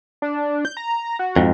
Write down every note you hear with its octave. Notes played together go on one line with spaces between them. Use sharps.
D4
G6
A#5
F#4
F2 G#2